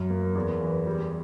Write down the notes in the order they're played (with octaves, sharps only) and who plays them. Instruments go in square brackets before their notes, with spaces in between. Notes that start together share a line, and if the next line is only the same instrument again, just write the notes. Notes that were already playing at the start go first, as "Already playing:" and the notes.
Already playing: [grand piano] F#2
A#3
E2
E3
G3